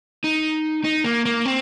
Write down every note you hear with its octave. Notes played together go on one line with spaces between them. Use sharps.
D#4
D#4
A#3
A#3
C4